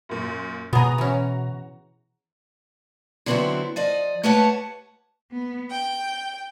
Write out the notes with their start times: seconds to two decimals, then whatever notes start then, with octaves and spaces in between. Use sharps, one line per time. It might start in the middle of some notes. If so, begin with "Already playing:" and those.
0.09 F#2 A#2
0.73 B2 B3 F#4 G#4 A#5
0.98 E3 C#4
3.26 D3 F#3 B3 C4 E4 F#4
3.76 F3 D5 D#5
4.23 A3 G4 B4 C#5 F#5 A5
5.32 B3
5.70 G5